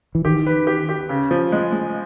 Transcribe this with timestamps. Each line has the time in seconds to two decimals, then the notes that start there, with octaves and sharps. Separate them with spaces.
0.15 E3
0.25 D#3 G4
0.46 B4
0.67 G4
0.89 G4
1.09 C#3
1.31 F3
1.52 G#3
1.72 G#3